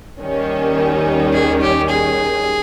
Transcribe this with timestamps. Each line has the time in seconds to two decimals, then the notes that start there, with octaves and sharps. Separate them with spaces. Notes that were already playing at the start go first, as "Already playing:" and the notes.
0.21 D#2 D#3 G3 C#4
1.33 G#4
1.61 G4
1.89 G#4